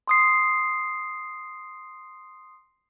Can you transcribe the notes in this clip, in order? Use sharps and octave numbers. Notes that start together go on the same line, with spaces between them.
C6 D#6 C7